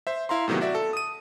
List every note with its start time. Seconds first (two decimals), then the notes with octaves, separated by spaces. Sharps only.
0.07 C5 E5
0.29 E4 F5 A#5 C6
0.48 A2 C3 D#3 F#3 B3
0.61 F#4 D5 E5
0.75 A4
0.93 D#6 D#7